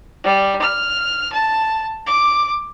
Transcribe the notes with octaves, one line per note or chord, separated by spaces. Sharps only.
G3
F6
A5
D6